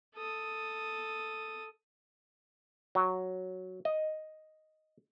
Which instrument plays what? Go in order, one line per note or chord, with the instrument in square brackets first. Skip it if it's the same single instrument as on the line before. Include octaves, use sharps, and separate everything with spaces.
[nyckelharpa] A4 D#6
[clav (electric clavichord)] F#3
D#5